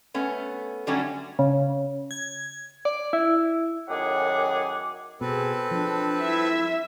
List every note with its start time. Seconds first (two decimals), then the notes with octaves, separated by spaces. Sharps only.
0.14 A3 B3 C#4
0.87 D3 F#3 G3 A3 C#4 F#4
1.39 C#3
2.11 G#6
2.85 D5
3.13 E4
3.88 F#2 A2 D#3 G#4 F#5 D6
5.21 B2 C4 G#4 A4 B4
5.71 F3 D4
6.20 E4 E5